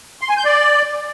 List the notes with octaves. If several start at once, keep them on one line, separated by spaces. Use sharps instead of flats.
C6
G#5
G6
D5